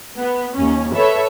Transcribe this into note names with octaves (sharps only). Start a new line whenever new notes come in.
B3
D#2 C#4
A4 B4 C#5 E5